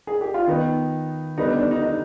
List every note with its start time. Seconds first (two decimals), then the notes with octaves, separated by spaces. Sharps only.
0.07 G#4
0.21 G4
0.34 F4
0.47 D#3 B3 D#4
1.38 D3 G3 B3 D#4
1.49 D4
1.60 D4
1.71 D#4
1.82 D#4